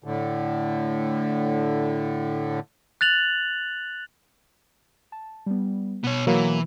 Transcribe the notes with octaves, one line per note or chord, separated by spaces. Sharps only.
A2 D3
F#6 A6 F7 F#7
A5
G3 B3
B2 B3 C#5
E3 F#3 A#3